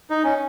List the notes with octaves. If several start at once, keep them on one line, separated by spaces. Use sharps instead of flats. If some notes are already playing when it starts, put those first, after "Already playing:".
D#4
C#4